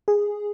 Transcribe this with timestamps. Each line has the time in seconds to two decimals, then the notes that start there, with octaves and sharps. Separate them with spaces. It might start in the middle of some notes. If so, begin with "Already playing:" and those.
0.08 G#4